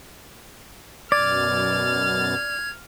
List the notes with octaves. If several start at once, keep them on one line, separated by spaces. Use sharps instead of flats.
F#2 B2 D5 F6 G#6 A6